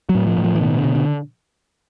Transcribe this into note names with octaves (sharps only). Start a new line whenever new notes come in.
F#3
A2
F3
A2
F3
E3
B2 D#3
D3
B2
D3